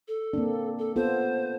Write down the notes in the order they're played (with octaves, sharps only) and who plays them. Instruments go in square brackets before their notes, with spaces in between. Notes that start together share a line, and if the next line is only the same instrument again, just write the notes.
[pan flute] A4
[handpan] A#3 C4 D4
[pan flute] A4
[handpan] B3 F4 A4 [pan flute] C5